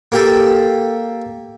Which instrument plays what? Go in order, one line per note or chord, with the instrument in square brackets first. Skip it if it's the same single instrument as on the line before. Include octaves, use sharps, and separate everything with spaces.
[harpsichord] A#3 G4 A4